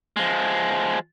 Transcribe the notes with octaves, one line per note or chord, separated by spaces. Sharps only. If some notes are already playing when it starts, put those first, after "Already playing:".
F3 G#3